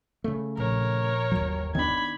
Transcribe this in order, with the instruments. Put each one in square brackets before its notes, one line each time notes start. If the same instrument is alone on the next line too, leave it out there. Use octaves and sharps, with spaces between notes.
[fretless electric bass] C#3 A3
[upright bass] A#1 [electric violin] A#4 C#5
[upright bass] G1 D#2 [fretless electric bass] F#3
[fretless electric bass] D#3 B3 D4 [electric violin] B5 G#6